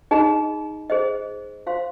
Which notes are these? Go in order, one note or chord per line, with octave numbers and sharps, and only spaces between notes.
D#4 G#4 D#5 A#5
G#4 C5 D#5
F4 C5 F5 C6